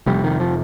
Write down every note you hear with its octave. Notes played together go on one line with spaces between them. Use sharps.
F1 F2 C3 G3
D#3
F3